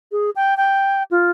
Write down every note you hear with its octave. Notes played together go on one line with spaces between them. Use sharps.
G#4
G5
G5
F4